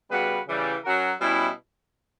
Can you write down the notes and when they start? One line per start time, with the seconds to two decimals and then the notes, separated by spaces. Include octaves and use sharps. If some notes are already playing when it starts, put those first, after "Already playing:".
0.09 C#3 G3 B3 F#4 B4
0.47 C#3 E3 G3
0.83 F#3 C#4 F#4 A#4
1.20 B2 G3 C#4 E4